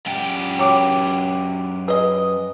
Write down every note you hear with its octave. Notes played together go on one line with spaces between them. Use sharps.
F#2 G4
F#3 G5 D6
G#4 B4 D#5